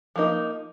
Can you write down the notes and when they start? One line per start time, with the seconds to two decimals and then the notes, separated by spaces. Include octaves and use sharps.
0.16 F3 A#3 D#4